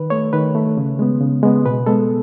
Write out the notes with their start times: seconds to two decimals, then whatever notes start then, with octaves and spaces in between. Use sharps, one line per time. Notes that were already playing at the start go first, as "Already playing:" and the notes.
Already playing: D#3 B4
0.10 A3 C#5
0.33 D#3 B4
0.55 A3
0.77 C#3
0.99 G#3 B3
1.20 C#3
1.43 G#3 B3
1.66 B2 B4
1.86 G#3 B3 A4